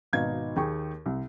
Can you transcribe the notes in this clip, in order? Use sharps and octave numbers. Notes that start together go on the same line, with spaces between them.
G#1 B2 D#4 F5 G#6
D#2 G#4 G5 C#6
C2